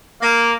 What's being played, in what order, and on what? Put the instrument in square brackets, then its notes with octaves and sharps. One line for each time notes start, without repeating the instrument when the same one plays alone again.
[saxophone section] A#3